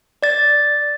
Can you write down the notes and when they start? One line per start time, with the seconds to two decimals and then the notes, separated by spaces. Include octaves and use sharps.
0.23 D5 A6